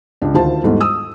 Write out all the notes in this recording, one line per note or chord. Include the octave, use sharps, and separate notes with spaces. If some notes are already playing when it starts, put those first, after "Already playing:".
C#2 D4
D2 D#3 F4 C5 A5
E2 G#2 G3 A3
D#6 E6